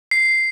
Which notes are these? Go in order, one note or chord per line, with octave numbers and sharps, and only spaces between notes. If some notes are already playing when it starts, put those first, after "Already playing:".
C7